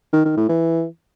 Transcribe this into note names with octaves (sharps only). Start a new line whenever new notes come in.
D#3
D#3
A2
E3